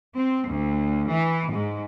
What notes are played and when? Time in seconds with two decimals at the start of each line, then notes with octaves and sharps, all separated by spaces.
0.15 C4
0.48 D2
1.10 E3
1.51 G#2